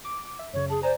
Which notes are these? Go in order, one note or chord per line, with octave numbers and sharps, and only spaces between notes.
D6
E5
F#2 C#3 C#5
G#4 A5
C5 D5 G#5 A#5